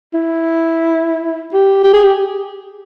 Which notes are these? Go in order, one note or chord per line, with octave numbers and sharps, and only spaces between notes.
E4
G4
G4
G#4
G4